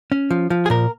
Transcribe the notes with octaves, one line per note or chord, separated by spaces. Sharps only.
C#4
F3
F3
G#4
A#2 A#4